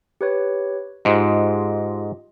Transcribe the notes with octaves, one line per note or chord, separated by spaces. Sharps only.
G4 B4 C#5
G#2 F4 G4 D#5